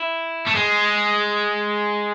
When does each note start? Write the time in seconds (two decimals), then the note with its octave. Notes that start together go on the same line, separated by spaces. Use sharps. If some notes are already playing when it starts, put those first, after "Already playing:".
Already playing: E4
0.47 A3
0.55 G#3